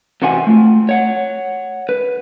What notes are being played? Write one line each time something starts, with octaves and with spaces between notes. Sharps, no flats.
C3 E3 F#4 C5 F#5 G#5
A3 F4
C#5 F#5
B4